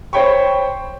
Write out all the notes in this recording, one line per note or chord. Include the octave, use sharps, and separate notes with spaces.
C5 C#5 G5 B5 C#6